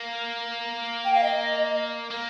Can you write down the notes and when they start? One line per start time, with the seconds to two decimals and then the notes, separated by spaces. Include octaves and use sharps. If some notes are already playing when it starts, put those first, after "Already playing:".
Already playing: A#3
1.04 G5
1.14 F5
1.23 D#5
2.10 A#3